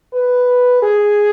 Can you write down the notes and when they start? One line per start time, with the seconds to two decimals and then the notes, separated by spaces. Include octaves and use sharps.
0.13 B4
0.82 G#4